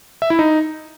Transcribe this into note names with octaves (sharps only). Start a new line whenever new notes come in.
E5
E4
D#4